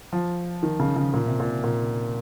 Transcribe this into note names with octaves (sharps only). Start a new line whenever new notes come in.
F3
D#3
C#3
C#3
A#2
C3
A#2
A#2